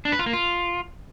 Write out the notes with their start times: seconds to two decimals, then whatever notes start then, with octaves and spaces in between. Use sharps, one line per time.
0.05 D4
0.12 B4
0.19 F4
0.26 A#3
0.33 F4